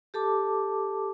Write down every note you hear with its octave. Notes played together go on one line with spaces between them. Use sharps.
G4 A4 A5 D6